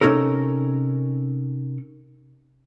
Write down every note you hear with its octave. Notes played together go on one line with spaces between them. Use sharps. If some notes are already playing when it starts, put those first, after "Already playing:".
C3 F3 C#4 D#4 A4 A#4